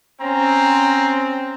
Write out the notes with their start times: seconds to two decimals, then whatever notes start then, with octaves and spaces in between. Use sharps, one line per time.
0.21 C4 C#4 A#5